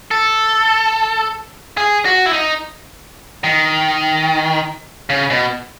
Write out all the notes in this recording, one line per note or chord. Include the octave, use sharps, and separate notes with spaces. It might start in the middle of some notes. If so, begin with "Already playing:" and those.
A4
G#4
F#4
E4
D#4
D#3
C#3
B2